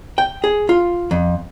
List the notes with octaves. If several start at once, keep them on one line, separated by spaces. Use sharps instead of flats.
G5
G#4
F4
F2